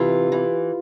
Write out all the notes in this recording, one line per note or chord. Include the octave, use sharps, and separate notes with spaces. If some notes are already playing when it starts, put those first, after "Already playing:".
Already playing: C3 E3 F4
E3